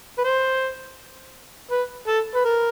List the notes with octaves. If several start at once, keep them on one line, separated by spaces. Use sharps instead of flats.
B4
C5
B4
A4
B4
A#4